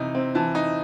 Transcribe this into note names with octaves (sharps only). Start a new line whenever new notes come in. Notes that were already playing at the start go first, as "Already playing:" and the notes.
Already playing: C3 E3 D#4
C4
E3 A5
D#4